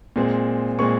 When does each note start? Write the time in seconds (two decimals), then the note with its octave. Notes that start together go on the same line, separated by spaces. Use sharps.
0.16 A#2 G#3 C4
0.79 A#2 G#3 C4 C#6